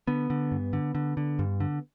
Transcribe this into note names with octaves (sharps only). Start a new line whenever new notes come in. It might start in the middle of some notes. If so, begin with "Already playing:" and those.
D3 B3
D3
G2
D3
D3
D3
G2
D3